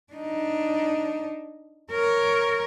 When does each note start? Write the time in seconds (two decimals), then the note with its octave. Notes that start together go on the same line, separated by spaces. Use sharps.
0.13 D4 D#4
1.92 A#4 C#5